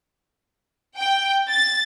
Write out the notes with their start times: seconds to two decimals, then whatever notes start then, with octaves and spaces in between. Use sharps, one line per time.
0.98 G5
1.51 A6